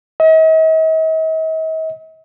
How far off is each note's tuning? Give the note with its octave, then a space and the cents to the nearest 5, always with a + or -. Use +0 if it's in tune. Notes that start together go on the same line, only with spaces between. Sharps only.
D#5 +45